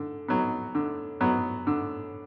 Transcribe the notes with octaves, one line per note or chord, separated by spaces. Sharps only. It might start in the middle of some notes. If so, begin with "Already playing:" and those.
Already playing: D3
F#3 B3
D3
F#3 B3
D3